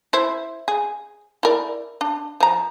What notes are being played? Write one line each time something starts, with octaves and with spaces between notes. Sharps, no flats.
E4 C5
G#4
E4 A#4 D5
D4
F3 A#5